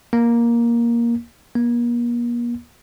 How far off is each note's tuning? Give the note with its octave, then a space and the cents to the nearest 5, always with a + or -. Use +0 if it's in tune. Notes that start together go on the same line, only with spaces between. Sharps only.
A#3 +10
A#3 +40